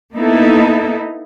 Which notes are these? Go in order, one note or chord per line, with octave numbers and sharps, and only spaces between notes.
A#3 B3 D#4 E4 A4